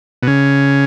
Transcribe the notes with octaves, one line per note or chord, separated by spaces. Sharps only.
B2
C#3